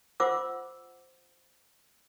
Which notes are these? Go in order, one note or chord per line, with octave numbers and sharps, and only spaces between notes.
F4 C5 F#5 D6 E6